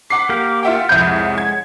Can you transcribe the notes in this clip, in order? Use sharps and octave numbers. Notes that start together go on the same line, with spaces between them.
F#5 D6 B6 C7
A#3 G4 A#4
F4 E5 F#5 G5
C2 F2 G#3 C#5 B5 G6
G#6